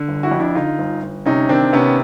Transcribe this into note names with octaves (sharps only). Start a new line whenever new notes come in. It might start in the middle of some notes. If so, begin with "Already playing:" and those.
Already playing: D3
G1
E4 F#4
F2
D4 E4
D3 D#4 F4
G1
G1
C3 C#4 D#4
D#3 C4 D4
C3 B3 C#4